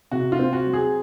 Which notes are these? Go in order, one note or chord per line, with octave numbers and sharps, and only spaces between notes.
C3 F#4
F4
C4
F#4
F#3
G#4